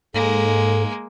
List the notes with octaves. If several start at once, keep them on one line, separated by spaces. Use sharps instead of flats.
G#2 G#3 A#3 A4